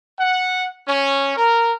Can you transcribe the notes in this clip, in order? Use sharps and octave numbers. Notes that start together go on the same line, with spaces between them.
F#5
C#4
A#4